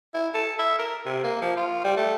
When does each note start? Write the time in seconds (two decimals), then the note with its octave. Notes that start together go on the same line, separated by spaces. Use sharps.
0.14 E4
0.34 A4
0.59 E5
0.79 A#4
1.06 C3
1.24 A#3
1.42 F3
1.57 F4
1.84 G3
1.97 A3